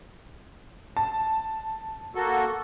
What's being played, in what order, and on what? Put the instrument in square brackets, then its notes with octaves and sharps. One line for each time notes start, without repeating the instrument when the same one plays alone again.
[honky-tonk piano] A5
[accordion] A#3 F#4 A4